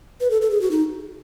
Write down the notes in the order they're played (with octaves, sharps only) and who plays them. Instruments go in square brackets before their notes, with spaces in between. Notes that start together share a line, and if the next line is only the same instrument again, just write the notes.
[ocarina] B4
A4
A4
G#4
F#4
D#4